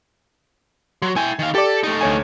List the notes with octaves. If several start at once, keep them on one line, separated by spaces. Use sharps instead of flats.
F#3 C6
E4 G5 G#5
D#3 F5
G4 A4 D5
A3 D#4
D2 C#5 G#5